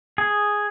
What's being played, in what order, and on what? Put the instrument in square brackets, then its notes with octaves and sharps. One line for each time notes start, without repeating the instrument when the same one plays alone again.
[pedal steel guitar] G#4